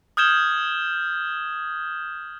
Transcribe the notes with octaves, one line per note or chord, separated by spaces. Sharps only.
D#6 F6 G6 G#6 E7 G7